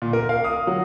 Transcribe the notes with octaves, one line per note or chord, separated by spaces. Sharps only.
A#2
A#4
F5
D#6
F#3